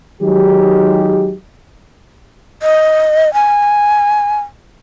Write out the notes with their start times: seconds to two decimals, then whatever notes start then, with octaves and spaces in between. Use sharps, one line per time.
0.22 D#3 F#3 G#3 D#4 G4
2.62 D#5
3.34 G#5